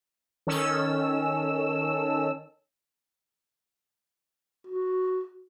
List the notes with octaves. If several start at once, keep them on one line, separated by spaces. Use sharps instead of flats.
D#3 C#4 A4 E6
F#4